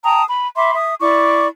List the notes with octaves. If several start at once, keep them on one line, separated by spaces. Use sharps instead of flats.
G5 A5 A#5 D#6
B5
E5 B5 C6 D6
E5 D#6
E4 D5 C#6 D6